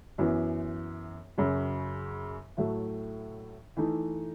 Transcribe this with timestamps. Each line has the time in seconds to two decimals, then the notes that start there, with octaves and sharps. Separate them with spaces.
0.18 F#2 E3 B3
1.38 F#2 C#3 F#3
2.57 A2 F#3 A3 E4
3.77 E3 A3 D#4